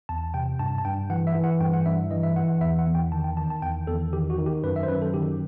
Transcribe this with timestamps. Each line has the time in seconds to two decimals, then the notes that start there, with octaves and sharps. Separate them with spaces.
0.09 E2 A5
0.34 C3 G5
0.59 G2 A5
0.78 A5
0.85 G2 G5
1.10 E3 F#5
1.27 E5
1.35 E3
1.44 F#5
1.60 G2 G5
1.74 F#5
1.86 G2 E5
2.11 E3 D#5
2.23 E5
2.36 E3 F#5
2.48 F#5
2.61 E2 E5
2.79 F#5
2.87 E2
2.95 G5
3.12 D#3 A5
3.24 G5
3.37 D#3 A5
3.50 A5
3.62 E2 G5
3.87 E2 A4
4.13 D#3 G4
4.30 F#4
4.38 D#3
4.46 G4
4.64 F#2 B4
4.76 E5
4.83 C5
4.88 F#2 B4
5.02 A4
5.14 D#3 G4